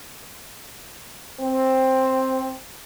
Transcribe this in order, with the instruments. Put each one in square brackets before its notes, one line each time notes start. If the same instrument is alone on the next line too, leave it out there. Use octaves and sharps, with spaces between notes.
[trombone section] C4